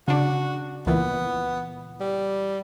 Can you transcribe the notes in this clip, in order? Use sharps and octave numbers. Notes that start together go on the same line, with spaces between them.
C#3 D4 F#4
C#2 A#2 E3 B3
G3